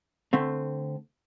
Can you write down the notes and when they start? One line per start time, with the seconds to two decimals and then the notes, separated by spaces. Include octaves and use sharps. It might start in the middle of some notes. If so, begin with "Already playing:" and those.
0.33 D3 A3 C4